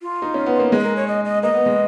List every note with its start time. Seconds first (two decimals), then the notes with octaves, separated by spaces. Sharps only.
0.02 F4
0.22 D#4
0.34 C#4
0.46 B3
0.59 A#3
0.72 G#3 G#4
0.79 B4
0.83 A#4
0.96 C#5
1.08 D#5
1.25 D#5
1.43 A#3 D#5
1.54 B3
1.66 G#3